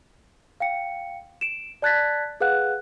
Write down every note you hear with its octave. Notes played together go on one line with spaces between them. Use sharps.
F5 G5 C#7
D7 E7
D5 A5 F#6 G#6 A6 B6
G#4 B4 F5 F#5 F#6